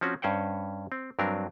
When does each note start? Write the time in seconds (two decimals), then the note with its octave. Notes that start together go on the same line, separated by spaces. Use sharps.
0.01 F3 C4 C#4 F#4
0.22 G2 C#4 C5 F#5 G5
0.92 C4
1.19 G2 F#3 C4 D4 A#4